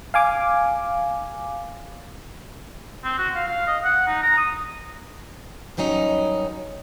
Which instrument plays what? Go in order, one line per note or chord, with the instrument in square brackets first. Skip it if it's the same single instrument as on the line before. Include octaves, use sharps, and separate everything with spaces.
[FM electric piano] F5 G#5 D6
[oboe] C4
F#4
F5
F5
D#5
F#5
D#4
A#5
D#6
[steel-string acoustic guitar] G2 D#3 F#3 C#4 D#4